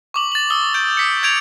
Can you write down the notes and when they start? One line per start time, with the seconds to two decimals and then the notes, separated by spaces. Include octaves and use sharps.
0.14 C#6 D6 F#7
0.32 A6 F#7
0.50 D#6 E6 F#7 G7
0.74 G6 D7
0.97 D6 B6 C#7
1.23 G6 G#6 D7 F7